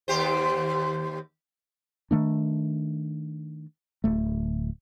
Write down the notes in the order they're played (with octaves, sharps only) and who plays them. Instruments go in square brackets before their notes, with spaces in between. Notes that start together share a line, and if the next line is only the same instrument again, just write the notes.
[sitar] D#2 G4 C5
[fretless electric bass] D#3 A3 D4
D1 A3